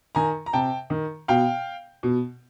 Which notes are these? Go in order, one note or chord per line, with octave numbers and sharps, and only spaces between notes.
D#3 G#5 A#5
A#5
C3 G5 A5
D#3
B2 F5 G5
B2